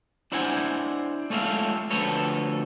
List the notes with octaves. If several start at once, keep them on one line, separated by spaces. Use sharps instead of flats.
D4 E4 C5 F#5 G#5
G#3 A3 C#4 F4 E5 F5
D2 F3 A4 B4 C#5